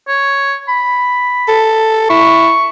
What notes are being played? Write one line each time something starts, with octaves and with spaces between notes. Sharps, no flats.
C#5
B5
A4
E4 C#6